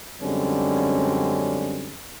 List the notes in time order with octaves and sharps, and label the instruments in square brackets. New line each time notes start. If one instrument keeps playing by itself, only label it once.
[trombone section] F#2 D3 G3 G#3 C4 C#4